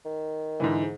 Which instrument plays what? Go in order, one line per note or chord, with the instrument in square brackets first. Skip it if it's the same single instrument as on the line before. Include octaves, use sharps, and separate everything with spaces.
[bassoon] D#3
[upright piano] G#2 D3 E3
[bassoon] G#2